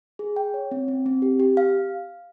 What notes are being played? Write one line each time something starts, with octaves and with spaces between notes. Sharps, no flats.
G#4
G5
C#5
C4
C4
C4
G4
G4
F5